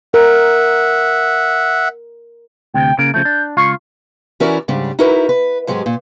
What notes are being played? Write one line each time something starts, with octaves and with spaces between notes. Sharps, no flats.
A#4 E5 F#5
D2 C3 G5
C#3 A#3 D7
C#3 F3 A3 G6
D4
C#2 F4 F5 C#6
E3 C#4 E4 F#4 A#4 D5
G#2 C#3 G3 D4
D#4 E4 F#4 A#4 B4
B4
G#2 F#3 G#3 G4
A#2